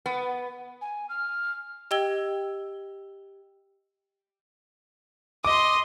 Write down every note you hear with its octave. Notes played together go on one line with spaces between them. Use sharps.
B3
G#5
F6
G4 D#5 G5 E6 G#6 G7
D#5 C6 D6